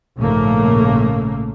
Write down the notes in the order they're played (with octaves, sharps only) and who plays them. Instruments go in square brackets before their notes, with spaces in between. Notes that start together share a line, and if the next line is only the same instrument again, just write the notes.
[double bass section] A#1 G#2 C#3 A3 A#3